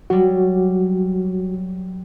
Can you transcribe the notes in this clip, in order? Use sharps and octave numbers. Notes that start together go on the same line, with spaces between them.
F#3 G3 F#4